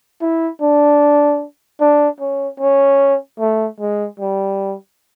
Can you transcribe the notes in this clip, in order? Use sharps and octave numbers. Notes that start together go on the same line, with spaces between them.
E4
D4
D4
C#4
C#4
A3
G#3
G3